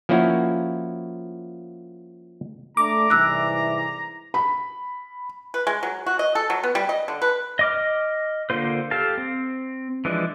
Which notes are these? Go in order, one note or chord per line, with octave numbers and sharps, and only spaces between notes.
F3 A#3 C#4 E4 F#4
A3 D4 A#5 D6
C2 G#2 E3 E6 F#6
B5
B4
G#3
F#3
F#4
D#5
A4
F#3
B3
G3
D#5
D3
B4
D#5 D6 F6
D3 A#3 F4 C5
G4 A4 F5 A5
C4
E3 F3 G#3 D4